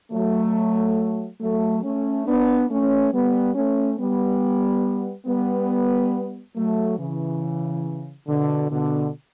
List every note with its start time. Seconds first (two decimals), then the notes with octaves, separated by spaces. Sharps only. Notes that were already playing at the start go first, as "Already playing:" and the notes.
0.12 F#3 A3
1.41 F#3 A3
1.83 A3 C#4
2.26 B3 D4
2.69 A3 C#4
3.12 G3 B3
3.55 A3 C#4
3.98 G3 B3
5.26 G3 B3
6.55 F#3 A3
6.98 C#3 E3
8.27 B2 D3
8.70 B2 D3